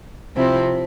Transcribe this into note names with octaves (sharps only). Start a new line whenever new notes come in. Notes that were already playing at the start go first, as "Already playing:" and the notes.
C3 F3 C4 E4